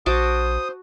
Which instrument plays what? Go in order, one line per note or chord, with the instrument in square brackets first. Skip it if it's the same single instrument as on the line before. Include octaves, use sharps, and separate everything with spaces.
[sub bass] A#1 [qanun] F#4 A5 D6 [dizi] C5 [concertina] D#6